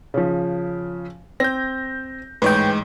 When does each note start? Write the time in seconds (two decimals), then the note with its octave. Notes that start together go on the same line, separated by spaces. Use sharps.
0.14 C#3 F3
1.40 C4 G6 A#6
2.42 A1 G#2 G#3 B4 C#5 G5